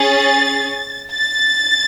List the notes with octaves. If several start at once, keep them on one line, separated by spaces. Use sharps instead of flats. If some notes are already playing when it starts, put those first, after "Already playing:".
Already playing: C#4 G#4 A6
A6